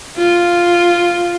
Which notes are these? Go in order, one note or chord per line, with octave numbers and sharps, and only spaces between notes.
F4